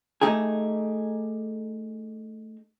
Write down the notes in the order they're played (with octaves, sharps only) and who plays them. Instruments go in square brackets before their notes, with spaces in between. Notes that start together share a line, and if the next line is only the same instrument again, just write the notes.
[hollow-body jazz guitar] A3 D#4 G4 G#4